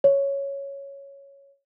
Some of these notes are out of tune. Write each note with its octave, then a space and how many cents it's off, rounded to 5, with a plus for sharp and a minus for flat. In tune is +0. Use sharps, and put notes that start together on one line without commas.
C#5 +0